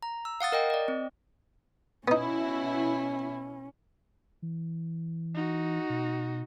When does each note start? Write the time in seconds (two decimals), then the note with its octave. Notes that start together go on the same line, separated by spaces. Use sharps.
0.03 A#5
0.25 E6
0.41 F5 F#5 D#6 A6
0.52 A#4 D#5 G5
0.70 D5 D#5
0.88 C4
2.08 B2 B3 C#4 D#4 E4
4.42 E3
5.35 D#4 F#4
5.90 B2